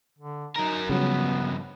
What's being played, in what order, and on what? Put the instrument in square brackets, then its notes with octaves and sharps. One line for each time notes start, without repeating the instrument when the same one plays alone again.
[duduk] D3
[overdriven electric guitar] F#3 A#4 [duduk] D#4
[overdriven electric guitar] G2 F3 [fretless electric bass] C#3 F#3 [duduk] B3